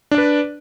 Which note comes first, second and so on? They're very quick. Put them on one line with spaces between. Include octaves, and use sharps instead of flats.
D4 D5 B4